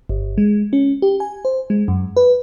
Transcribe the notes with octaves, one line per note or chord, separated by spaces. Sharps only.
G1
G#3
C#4
G4
G#5
C5
G#3
F#2
B4